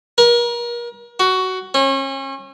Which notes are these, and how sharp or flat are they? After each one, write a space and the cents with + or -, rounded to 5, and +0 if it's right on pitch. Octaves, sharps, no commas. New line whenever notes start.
A#4 +35
F#4 +15
C#4 -35